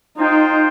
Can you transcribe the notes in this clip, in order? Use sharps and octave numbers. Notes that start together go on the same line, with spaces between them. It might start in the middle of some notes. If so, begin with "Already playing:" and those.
D#4 F4 C5 G5